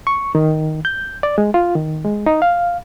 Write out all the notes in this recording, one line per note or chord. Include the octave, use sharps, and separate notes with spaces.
C#6
D#3
G6
D5
G#3
F4
D#3
G#3
D#4
F5